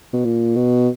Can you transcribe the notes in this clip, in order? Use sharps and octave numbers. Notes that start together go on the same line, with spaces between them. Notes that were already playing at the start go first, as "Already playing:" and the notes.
B2
A#2
B2